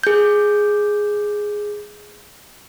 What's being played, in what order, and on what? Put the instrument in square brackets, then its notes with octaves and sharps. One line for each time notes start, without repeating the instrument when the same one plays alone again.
[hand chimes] G#4 G6